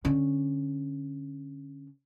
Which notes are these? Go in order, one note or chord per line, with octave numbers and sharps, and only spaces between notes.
D3 C#4